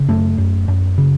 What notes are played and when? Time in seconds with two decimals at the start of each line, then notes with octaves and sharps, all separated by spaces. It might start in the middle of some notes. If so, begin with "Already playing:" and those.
Already playing: C#3
0.08 F#2 A3
0.38 F#2
0.68 F#2
0.98 C#3